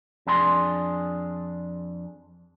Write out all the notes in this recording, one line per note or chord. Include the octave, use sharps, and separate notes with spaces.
F2 D4 G#4 C6